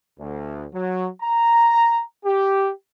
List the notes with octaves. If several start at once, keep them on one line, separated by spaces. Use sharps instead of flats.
D2
F#3
A#5
G4